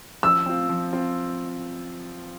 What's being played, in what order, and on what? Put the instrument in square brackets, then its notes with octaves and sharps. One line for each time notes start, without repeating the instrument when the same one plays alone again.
[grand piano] F3 [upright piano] E6
[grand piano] C4 F4
F3
C4 F4